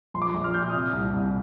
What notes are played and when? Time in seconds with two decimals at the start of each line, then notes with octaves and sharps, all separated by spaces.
0.14 A#1 C6
0.22 D6
0.29 A#1 C6
0.44 F6
0.54 A#2 G6
0.63 F6
0.69 D#6
0.74 C3 F6
0.93 C2
1.14 C2